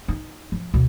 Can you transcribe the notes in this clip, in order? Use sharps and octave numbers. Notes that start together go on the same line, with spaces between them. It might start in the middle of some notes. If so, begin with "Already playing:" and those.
D#4
F3
D2 B2